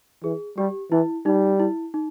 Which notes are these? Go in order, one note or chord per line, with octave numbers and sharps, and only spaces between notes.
E3 G#4
G3 G4
E3 E4
G3 D#4
E4
D#4